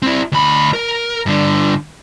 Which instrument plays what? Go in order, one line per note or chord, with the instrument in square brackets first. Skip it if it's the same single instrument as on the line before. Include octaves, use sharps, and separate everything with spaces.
[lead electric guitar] C4 E4
D2 B5
A#4
G2 D3